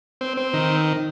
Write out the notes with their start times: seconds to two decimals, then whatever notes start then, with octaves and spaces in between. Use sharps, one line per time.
0.21 C4
0.37 C4
0.54 D#3